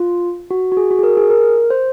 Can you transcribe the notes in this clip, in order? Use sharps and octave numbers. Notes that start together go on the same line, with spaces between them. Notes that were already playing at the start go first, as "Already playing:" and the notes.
Already playing: F4
F#4
F#4
G#4
F#4
G#4
A#4
G#4
A#4
C5